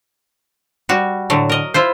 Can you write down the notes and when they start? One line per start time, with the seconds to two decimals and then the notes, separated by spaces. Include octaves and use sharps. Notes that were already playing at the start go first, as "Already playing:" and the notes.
0.89 G3 F#4
1.30 A2 D3 F#3
1.49 A#4 D#5
1.74 E4 F4 C5